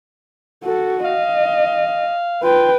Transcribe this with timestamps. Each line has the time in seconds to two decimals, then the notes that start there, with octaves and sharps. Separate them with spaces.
0.64 F#4 A4
1.05 D#5 F5
2.43 F4 B4 G5